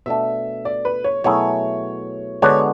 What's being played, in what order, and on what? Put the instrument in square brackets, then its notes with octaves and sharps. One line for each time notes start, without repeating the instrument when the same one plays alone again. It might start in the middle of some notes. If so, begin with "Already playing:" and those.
[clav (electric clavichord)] B2 A3 D4 A4 [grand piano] E5
[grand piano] D5
B4
C#5
[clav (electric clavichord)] B2 F#3 A3 E4 G#4 [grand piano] C#5
[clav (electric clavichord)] D3 G#3 B3 D4 F#4 [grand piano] C#5